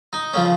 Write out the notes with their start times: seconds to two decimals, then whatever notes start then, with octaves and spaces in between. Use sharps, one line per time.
0.13 D#4
0.33 C#3 F3 C#4